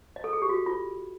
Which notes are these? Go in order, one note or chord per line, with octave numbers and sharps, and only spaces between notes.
D#5
A4
G#4
G4
F#4
F4